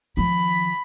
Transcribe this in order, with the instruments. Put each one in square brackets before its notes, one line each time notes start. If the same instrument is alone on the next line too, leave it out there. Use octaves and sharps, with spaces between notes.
[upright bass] D#3 F3 [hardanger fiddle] B5